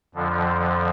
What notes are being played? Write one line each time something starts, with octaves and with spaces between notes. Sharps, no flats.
F2 D3 F3